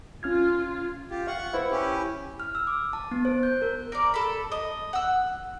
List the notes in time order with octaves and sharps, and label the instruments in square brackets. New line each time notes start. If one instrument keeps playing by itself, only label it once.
[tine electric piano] C#4 F6 G#6 [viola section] F4
[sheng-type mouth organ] F4 G4
[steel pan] F5 [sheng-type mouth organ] F#5 C#6
[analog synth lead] E4 [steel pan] B4 C5 F5
[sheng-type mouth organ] C#4 G4
[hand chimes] F6
E6
D6
A5
B3
C5
G6
A#4
[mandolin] A#4 D5
A4 B5
D#5
F#5 E6